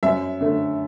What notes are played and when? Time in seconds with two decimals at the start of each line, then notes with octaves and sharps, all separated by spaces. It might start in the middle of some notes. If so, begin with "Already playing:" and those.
0.03 F#2 E5
0.41 D3 A3